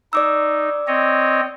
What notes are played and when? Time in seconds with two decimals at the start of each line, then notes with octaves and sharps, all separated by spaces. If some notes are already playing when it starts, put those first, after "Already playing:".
0.13 D#4 D5 D6 E6
0.87 C4 C#5 D#5